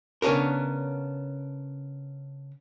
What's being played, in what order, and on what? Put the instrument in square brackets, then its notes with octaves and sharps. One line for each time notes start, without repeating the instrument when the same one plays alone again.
[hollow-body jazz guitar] C#3 B3 C#4 D4 A#4